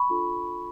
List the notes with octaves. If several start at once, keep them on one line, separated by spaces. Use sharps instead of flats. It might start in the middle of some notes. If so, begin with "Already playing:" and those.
Already playing: B5 C#6
D4 F4 A4